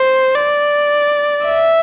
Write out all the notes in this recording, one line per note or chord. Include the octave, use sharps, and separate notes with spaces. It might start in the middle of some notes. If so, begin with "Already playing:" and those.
Already playing: C5
D5
E5